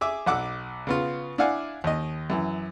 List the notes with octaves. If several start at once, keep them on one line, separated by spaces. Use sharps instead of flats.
G#4 E5 D6
B1 F#5 D6 E6
C#3 B3 F4
D4 E4 D5 F5 F#5 G#5
D#2 D#5
F#2 E3